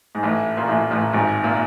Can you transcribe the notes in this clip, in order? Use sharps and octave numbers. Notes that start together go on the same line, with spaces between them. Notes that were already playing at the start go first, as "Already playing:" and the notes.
G#2
A1 A2
A#2
A1 A2
A1 A2
G#1 G#2
A#2